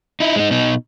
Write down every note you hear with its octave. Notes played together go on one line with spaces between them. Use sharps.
D#4 E4
G#3 D#4
B2 D#4